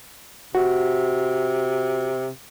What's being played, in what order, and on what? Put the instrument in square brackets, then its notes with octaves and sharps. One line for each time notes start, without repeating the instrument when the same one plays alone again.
[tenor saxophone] C3 [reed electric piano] F#4